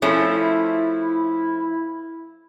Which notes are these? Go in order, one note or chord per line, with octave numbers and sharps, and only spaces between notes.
F3 A3 C#4 E4